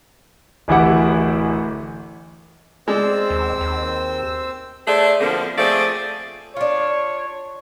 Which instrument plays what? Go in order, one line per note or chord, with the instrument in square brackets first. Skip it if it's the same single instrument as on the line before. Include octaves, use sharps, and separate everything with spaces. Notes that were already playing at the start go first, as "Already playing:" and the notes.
[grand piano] D1 A1 E3 E4 G4 F#5
[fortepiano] G#3 [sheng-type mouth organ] C4 C5 E6 [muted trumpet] D5
[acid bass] D#2 [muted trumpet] G5
[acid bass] D#2
[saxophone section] A3 G#4 C5 D5 E5
B2 D3 F3 A#3 C4
F3 A3 C4 G#4 D5
[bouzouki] D4 F4 [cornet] C#5